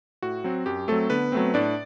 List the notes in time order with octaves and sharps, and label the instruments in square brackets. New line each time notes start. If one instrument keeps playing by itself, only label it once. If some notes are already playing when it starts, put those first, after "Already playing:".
[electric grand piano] A2 F#4
F#3 C4
F#2 G4
F#3 A3 C4 A4
D3 B3 B4
F#3 A3 C4
A2 D4 D5